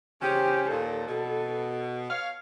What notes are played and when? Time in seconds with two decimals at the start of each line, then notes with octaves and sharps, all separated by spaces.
0.22 C#3 C#4 G4 C5
0.70 D#2 A#2 A4
1.08 B2
2.10 C#5 F5